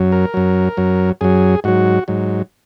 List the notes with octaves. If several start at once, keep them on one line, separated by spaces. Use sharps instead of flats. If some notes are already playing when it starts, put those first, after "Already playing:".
Already playing: F#2 F#3
A#4
F#2 F#3
F#2 F#3
F#2 F#3 G#4
G#2 F#3 F#4
G#2 F#3